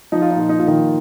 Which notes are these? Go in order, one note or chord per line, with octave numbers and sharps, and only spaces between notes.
F3 D#4
F4
D#4
A#2 F4
D#4
A#2 F4
D#3 D#4